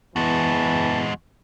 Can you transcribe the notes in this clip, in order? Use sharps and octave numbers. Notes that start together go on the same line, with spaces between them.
E2 E3 G#3 F#4 A5